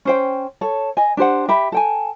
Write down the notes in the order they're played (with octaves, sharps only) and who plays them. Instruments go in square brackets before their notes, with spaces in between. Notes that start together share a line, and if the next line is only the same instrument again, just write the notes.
[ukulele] C#4 C5 G5
A4 C#5
D#5 G#5
D4 G4 C5 F#5
G4 E5 B5
A4 G5 G#5